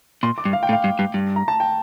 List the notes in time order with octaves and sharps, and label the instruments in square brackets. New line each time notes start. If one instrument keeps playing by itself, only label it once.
[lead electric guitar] A#2 [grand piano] C6
[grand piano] D6
[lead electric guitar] G2
[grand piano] F5
G5
[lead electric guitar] A2
[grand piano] F5
[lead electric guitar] G2
G2
G2
[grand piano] A#5
A5
G5